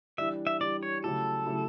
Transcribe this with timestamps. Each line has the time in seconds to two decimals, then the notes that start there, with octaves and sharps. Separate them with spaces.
0.18 E3 G3 D4 E5
0.47 E5
0.61 E3 G3 D4 D5
0.83 C#5
1.03 C#3 F#3 A3 E4 G4 A4
1.46 C#3 F#3 A3 E4 G4